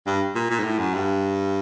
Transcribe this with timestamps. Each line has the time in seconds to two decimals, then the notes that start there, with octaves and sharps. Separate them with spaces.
0.07 G2
0.35 A#2
0.50 A#2
0.59 G#2
0.64 A2
0.79 F#2
0.94 G2